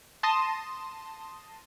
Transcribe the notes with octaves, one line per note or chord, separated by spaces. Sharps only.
A5 C6 D#6 A#6 D#7 E7